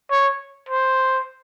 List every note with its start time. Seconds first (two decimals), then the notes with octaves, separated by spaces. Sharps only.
0.11 C#5
0.69 C5